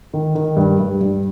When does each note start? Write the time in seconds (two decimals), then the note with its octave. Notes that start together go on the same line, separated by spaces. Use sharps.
0.14 D#3
0.35 D#3
0.56 G2
0.79 G2
1.01 G2